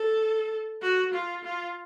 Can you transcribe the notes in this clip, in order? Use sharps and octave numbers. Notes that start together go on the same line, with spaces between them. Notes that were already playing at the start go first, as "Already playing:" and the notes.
Already playing: A4
F#4
F4
F4